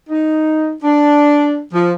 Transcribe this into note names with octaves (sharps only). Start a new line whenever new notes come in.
D#4
D4
F3